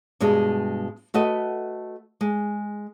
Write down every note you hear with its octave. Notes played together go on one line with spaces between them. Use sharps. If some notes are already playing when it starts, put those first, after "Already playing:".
G2 B2 G3 G#3
A3 F#4 B4 D#5
G#3